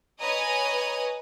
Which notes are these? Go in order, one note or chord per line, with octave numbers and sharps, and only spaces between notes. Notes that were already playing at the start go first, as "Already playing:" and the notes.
B4 C#5 D#5 G#5 A#5 D#6